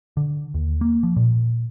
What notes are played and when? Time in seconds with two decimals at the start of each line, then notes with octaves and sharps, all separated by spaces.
0.17 D3
0.54 D#2
0.81 A#3
1.03 F3
1.16 A#2